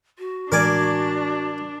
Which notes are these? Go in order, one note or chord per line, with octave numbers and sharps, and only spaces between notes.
F#4
A2 E3 G#3 D4 A#4 D5 G#5